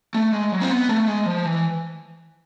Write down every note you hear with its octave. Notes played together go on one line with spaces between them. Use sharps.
A3
G#3
F#3
C4
B3
A3
G#3
F3
E3